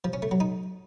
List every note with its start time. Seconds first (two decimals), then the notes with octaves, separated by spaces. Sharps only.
0.04 F3
0.13 C#4
0.22 A3
0.31 F#3
0.40 D#4